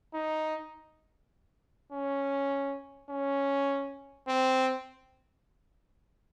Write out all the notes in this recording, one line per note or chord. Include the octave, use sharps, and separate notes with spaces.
D#4
C#4
C#4
C4